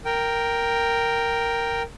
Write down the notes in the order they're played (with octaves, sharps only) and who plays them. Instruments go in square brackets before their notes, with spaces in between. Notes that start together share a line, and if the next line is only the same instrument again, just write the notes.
[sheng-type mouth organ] A#4 G5